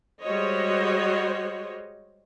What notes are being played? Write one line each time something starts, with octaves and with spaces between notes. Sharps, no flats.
G3 G#3 F#4 C5 C#5 D#5